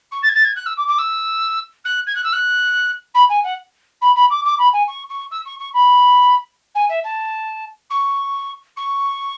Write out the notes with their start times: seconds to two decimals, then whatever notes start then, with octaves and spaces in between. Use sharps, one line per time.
0.11 C#6
0.23 A6
0.29 G#6
0.34 A6
0.44 G#6
0.55 F#6
0.66 E6
0.77 D6
0.87 D6
0.98 E6
1.84 F#6
2.06 G#6
2.15 F#6
2.24 E6
2.32 F#6
3.14 B5
3.29 G#5
3.43 F#5
4.01 B5
4.15 B5
4.30 D6
4.45 D6
4.58 B5
4.73 G#5
4.87 C#6
5.09 C#6
5.31 E6
5.45 C#6
5.59 C#6
5.74 B5
6.75 G#5
6.89 E5
7.04 A5
7.90 C#6
8.76 C#6